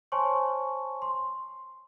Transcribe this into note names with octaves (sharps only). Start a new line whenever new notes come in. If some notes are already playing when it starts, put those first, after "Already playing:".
C5 C#5 G#5 A5 C6 C#6
C6